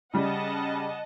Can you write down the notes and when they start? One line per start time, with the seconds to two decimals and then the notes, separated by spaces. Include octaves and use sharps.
0.14 C#3 G3 D#5 F#5 A5